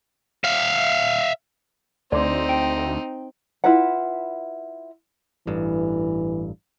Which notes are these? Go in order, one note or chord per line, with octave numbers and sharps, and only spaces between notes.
E5 F5
D2 C4 D#4 D5 C6 D6
G5 D7
E4 F4 B4 F#5
A1 G2 E3